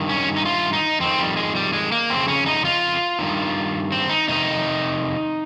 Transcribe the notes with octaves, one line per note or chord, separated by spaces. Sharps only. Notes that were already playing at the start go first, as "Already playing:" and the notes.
Already playing: G2 D#3
C#4
D#4
F4
D#4
F2 D#3 C4
G3
G#3
G3
G#3
A#3
F2 C#3 C4
C#4
D#4
F4
G2 D#3
C4
D#4
F2 C3 D#3 D#4